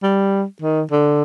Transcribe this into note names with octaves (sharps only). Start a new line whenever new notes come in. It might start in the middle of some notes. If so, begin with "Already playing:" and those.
G3
D#3
D3